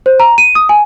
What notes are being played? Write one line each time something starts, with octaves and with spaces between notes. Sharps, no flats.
C5
A#5
D#7
D#6
G#5